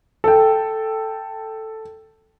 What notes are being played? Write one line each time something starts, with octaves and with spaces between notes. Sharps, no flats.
A4 G5